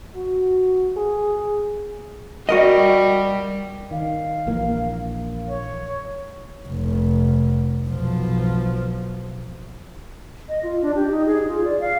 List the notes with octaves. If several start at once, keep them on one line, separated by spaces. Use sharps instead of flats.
F#4
G#4
G3 F#4 A#4 D#5
D#3 F5
A#1 E3 A#3
C#5
F1
B1 F3
D#5
F4
D4
G4
D#4
G#4
F4
D5
F5